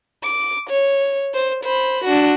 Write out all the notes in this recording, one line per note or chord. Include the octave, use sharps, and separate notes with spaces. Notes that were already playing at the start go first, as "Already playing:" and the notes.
D6
C#5
C5
C5 B5
D4 F#4